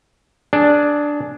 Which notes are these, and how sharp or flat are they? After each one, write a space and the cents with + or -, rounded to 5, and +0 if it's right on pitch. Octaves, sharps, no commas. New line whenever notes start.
D4 +0 G#4 +20